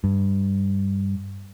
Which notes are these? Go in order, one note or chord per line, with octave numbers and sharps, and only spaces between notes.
G2